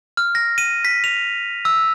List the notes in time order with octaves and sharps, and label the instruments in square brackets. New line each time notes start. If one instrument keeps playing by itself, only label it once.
[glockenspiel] F6
A#6
D#7
B6
F7
E6